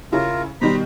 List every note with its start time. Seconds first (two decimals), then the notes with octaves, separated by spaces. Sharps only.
0.12 C#3 C#4 E4 F4 A#4
0.61 B2 D#3 G3 C5 A#5 B5